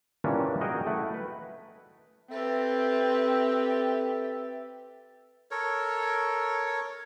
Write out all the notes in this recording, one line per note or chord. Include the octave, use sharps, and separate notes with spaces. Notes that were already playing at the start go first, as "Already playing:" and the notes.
A#2 D#3 E3 G3 C#4 D4
F#4 G#4 A#4 D#5 G5
A3 E4 F#5
B4
C4 G4 A4 B4 E5
A4 A#4 C#5